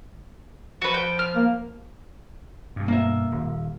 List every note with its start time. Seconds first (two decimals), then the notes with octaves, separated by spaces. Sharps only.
0.82 F3 F#4 B4
0.94 G5
1.19 F6
1.36 A#3
2.76 G2 B2
2.88 A#3 E5
3.32 D#1